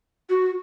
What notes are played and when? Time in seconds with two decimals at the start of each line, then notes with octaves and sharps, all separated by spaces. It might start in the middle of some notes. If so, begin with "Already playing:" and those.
0.29 F#4